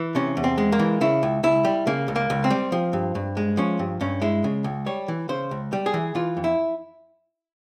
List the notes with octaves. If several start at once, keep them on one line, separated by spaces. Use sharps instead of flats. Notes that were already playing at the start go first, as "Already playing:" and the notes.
Already playing: E3
C3 C#4
E2
C4
G#3
A#3
E3
C#3 E4
C#2
C#2 E4
G3
C#3 A#3
C#2
A#3
C#2
C4
G3
F3
G2
G2
G#3
F3 C#4
G2
G2 C#4
G#3 E4
C#3
C#2
G3 C#5
E3
C#3 C5
C#2
G3
G#4
E3
E3 F4
F2
E4